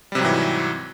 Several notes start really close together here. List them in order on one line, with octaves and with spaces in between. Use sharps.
G3 C3 F#3 G#2 E3